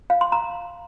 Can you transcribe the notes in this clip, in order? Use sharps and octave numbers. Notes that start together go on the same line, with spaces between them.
F5
C6
A#5